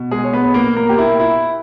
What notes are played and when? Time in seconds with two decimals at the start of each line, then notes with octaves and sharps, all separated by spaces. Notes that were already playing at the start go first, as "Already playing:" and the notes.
Already playing: B2
0.11 G#3 G#4
0.24 C#5
0.33 B3 B4
0.54 A#3 A#4
0.76 A#3 A#4
0.89 G4
0.98 E4
1.19 E4